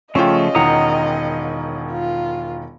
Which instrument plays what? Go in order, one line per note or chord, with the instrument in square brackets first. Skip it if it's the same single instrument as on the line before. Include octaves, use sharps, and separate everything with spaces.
[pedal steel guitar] C#3 F3 A3 [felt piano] C#4 F4 G5 [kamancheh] D#5
[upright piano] E1 D#3 [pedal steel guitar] F#5 A#5 D#6
[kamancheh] F4